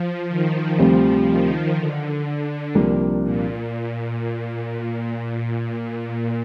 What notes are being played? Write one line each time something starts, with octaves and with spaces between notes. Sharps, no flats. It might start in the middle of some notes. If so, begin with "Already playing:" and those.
Already playing: F3
D#3
D2 C3 F3 G3 C4
D#3
D3
C2 C3 F3 A#3 D4
A#2